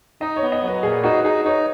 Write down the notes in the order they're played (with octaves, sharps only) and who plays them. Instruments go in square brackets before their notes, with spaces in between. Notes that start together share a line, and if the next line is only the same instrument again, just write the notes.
[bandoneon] D#4 [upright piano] D#5
[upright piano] C#5
[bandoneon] B3
[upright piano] D#5
[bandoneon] F#3
[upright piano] B4
[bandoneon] A#2 [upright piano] G#4
[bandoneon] D#4 [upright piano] F#4
[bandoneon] D#4 [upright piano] G#4
[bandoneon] D#4 [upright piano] C#5